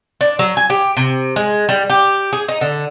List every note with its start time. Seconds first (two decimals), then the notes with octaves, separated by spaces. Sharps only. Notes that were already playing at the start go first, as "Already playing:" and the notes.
0.21 D4
0.39 F#3
0.57 G#5
0.70 G4
0.97 C3
1.36 G#3
1.69 G3
1.90 G4
2.33 G#4
2.48 D#4
2.61 D3